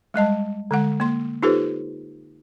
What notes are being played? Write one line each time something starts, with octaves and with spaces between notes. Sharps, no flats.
G3 G#3 D#5 A5
D3 G#3 F#5
A#3 C6
D#4 F4 G4 A4 B4 C5